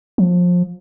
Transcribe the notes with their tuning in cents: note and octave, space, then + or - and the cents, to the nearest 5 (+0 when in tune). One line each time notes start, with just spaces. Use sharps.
F3 +25